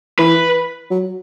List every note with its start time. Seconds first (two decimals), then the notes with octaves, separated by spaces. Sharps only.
0.19 E3 B4
0.91 F#3